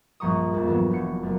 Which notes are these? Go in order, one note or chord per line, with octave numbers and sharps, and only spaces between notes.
A#1 G2 F3 A#5 C#6 D#6
F2 G#2 A#3 G#4
E3 F#3 B3 D4 A4 A#4
F1 F#3 C#7
F#1 A3 A#4